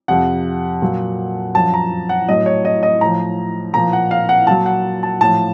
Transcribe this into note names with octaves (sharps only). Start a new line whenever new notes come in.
F2 C3 F3 F#5
A#2 F#3
F#2 F3 A5
A#5
F#5
A2 F#3 D#5
C#5
D#5
D#5
A2 F3 A#5
A#2 F3 A#5
F#5
F5
F#5
A#2 F#3 A5
F#5
A5
A2 F3 A5